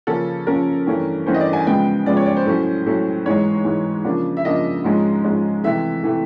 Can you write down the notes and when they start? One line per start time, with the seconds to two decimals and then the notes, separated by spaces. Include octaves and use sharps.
0.07 C#3 F3 A#3 C#4 A4
0.47 C#3 F3 A#3 C#4 A#4
0.87 G2 E3 A3 C#4
1.26 G2 E3 A3 C#4 C5
1.34 D#5
1.41 D5
1.53 G#5
1.66 C#3 F3 G#3 B3 G5
2.06 C#3 F3 G#3 B3 D5
2.17 C#5
2.26 D5
2.36 C5
2.46 A2 F#3 A3 C#4
2.86 A2 F#3 A3 C#4
3.26 G#2 E3 G#3 C#5
3.64 G#2 E3 G#3
4.04 C#3 F3 A#3 D4
4.37 E5
4.45 C#3 F3 A#3 D4 D#5
4.84 G#2 F3 G#3 C#4
5.24 G#2 F3 G#3 C#4
5.63 C3 E3 A3 E5
6.04 C3 E3 A3